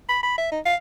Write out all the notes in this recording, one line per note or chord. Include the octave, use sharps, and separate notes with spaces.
B5
B5
E5
D#4
F5